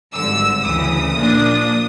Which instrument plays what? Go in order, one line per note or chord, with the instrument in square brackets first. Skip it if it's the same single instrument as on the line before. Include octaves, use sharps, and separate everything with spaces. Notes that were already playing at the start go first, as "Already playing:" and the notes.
[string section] G#1 G2 D3 E6
D2 C#3 E3 D#6
A#2 F3 A#3 D4